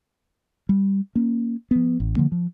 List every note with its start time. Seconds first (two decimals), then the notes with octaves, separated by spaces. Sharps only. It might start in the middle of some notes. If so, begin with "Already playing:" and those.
0.69 G3
1.15 A#3 C#4
1.71 F3 B3
2.00 A1
2.16 D3 F3 A#3
2.32 F3